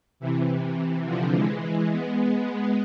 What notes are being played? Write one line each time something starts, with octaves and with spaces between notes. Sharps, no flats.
C3 E3
C3 E3
D3 F3
E3 G#3
G#3 B3